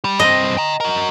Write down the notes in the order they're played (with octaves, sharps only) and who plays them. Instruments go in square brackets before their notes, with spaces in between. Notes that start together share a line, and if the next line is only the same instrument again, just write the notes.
[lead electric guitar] G3
[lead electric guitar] G2 C4 [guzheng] D#5
[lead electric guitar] G5 A#5
F#4 A#4